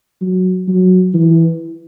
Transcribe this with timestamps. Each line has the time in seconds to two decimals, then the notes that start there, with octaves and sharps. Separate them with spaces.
0.21 F#3
0.68 F#3
1.14 E3